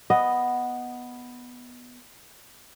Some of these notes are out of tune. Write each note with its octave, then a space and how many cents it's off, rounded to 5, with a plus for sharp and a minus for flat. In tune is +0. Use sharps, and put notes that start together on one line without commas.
B3 +0 D#5 +0